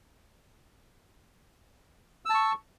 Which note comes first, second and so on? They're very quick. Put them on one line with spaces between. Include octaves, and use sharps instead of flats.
E6 A5 C#6